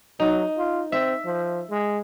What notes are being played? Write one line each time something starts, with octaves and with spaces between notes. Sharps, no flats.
F#3 D#4
F4
C4 E5
F3
G#3